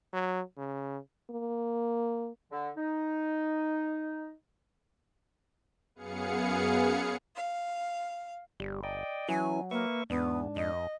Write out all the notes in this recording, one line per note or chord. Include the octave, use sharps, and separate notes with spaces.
F#3
C#3
A#3
D3
D#4
F#2 B3 G#4 F5 C#7
F5
G1 G3
D5 D#5 G5
E3 F#3 C#4 E4 G#5
A#3 B4 E5 C#6
E2 G#2 B3 D4
F2 D#5